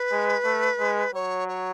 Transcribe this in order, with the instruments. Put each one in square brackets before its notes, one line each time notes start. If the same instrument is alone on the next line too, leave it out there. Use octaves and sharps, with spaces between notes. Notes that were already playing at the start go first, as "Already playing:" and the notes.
Already playing: [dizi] B4
[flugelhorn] G#3
A3
G#3
[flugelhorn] F#3 [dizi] C#5
[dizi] C#5